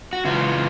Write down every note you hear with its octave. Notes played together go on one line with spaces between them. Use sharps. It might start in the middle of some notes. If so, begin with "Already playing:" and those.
F#4
C#3 E3 F4